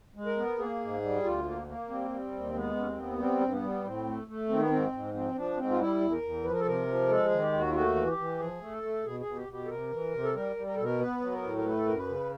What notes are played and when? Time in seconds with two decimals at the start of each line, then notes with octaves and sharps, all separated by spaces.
0.15 G#3
0.26 A#4
0.37 B3
0.58 A#3 G#4
0.80 G#2
1.02 G3
1.24 D2 F4
1.45 A#3
1.67 A#3
1.89 G3 C4
2.10 G3
2.32 D#2
2.54 G#3 B3
2.75 D#2 C#4
2.86 C4
2.97 B3
3.18 G3 C4
3.41 G2
3.52 B3
3.62 G3
3.84 A2 C4
4.06 A3
4.27 A3
4.49 D#3 C4
4.59 B3
4.69 G#2 C4
4.92 G#2
5.14 F3 C4
5.35 F3 D4
5.57 G#2 C4
5.71 F4
5.79 G3 E4
6.00 E2
6.12 A#4
6.22 E2
6.44 F3 B4
6.52 A#4
6.60 A4
6.65 C3 A#4
6.87 F3
7.09 G#3 A4
7.25 G#4
7.31 D#3
7.42 G4
7.53 D#2
7.58 F#4
7.70 F4
7.74 A3 F#4
7.96 E3
8.07 G4
8.17 E3
8.39 F3 G#4
8.60 A3
8.72 A4
8.83 A3
9.04 B2 G#4
9.20 G#4
9.26 B2
9.36 G4
9.48 B2 G4
9.65 A4
9.69 C3 A#4
9.91 E3
10.13 C3
10.23 A4
10.34 G3 A#4
10.56 G3
10.67 A#4
10.75 B2 A4
10.84 A#4
10.99 B3 B4
11.21 F#3
11.32 A#4
11.43 A2
11.58 A#4
11.64 A3 B4
11.77 A4
11.86 F#2 A#4
11.97 B4
12.08 C#3